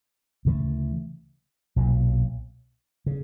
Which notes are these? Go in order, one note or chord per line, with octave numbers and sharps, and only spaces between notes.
D2 C#3 E3 A3
B1 A#2 F#3
C#3